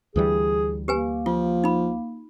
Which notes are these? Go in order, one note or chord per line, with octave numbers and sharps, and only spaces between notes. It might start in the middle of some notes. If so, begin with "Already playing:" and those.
D2 E3 G3 G#4
A#3 G4 B4 G#5
F3 F4
D#4 B5